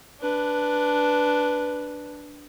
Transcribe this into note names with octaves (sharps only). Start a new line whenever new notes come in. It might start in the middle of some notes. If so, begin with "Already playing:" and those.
D4 B4